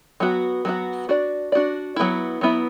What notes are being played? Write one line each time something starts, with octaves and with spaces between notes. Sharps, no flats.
F#3 B3 F#4
F#3 B3 F#4
D4 F#4 D5
D4 F#4 D5
F#3 B3 E4
F#3 B3 E4